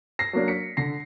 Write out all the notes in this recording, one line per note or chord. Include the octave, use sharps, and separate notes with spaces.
A#6 C7
F#3 A#3 D4
B6 C#7
D3 A#6 C7